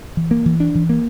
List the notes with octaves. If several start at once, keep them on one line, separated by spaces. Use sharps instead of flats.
E3
A#3
E3
D4
E3
A#3